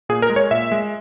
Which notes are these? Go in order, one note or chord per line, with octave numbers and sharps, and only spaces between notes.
A#2 G#4
A#4
G#3
C#5
A#2 E5
G#3